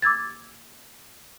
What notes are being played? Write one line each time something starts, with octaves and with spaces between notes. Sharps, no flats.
D6 E6 G#6 A6